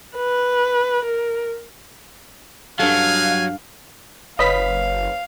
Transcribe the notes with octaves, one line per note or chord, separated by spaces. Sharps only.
B4
A#4
G2 F#3 A4 F5 G#5
F#1 B4 C#5 D#5 F5 B5 B6